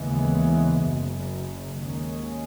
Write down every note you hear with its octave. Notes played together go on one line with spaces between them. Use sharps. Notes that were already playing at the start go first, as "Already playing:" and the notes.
Already playing: D#2 C#3 E3 G#3 B3
F#1 F#2 C#3
D#2 D#3 G#3 C#4